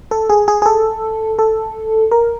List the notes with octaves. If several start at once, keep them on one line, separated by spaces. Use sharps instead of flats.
A4
G#4
G#4
G#4
A4
A4
A#4